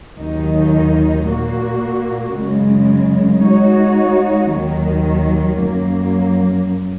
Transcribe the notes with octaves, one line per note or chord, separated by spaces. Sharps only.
D#2 D#3 F#3 D#4
A#2 A#3 F#4
F#2 C#3 G#3
G#3 D#4 F#4 C#5
D#2 D#3 F#3
F#2 F#3 A#3